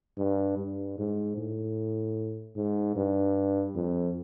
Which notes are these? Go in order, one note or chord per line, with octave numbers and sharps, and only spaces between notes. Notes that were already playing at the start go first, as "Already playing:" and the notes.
G2
G2
G#2
A2
G#2
G2
F2